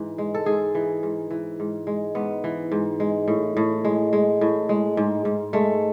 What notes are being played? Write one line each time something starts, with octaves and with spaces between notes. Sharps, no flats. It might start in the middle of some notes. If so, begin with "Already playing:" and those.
Already playing: G#2 E3
G#3
A4
G#2 G#4
E3
G#2
E3
G#2
G#3
G#2 B3
E3
G#2
G#3
A2
A2
G#3
G#3
A2
G#3
G#2
G#2
G#3 A3